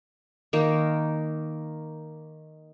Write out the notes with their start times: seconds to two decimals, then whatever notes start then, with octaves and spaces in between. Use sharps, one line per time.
0.53 D#3 A#3